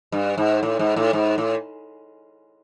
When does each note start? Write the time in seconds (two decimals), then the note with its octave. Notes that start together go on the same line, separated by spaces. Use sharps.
0.12 G2
0.38 G#2
0.63 A2
0.79 G#2
0.96 A2
1.13 G#2
1.38 A2